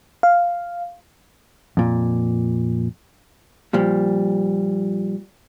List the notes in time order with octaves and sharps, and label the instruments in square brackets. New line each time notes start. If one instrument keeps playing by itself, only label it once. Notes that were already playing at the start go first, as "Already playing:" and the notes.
[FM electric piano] F5
[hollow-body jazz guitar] F2 A#2
A#2 F3 G3